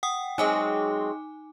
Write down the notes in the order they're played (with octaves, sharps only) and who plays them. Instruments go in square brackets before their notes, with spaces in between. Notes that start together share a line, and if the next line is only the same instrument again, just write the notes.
[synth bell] F#5 G5 D#6
[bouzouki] F#3 G#3 C4 [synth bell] D#4 G#5 D6